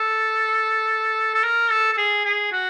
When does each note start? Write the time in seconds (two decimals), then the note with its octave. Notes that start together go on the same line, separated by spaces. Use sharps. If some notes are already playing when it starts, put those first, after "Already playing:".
Already playing: A4
1.34 A4
1.44 A#4
1.71 A4
1.93 A4
1.98 G#4
2.25 G#4
2.52 F#4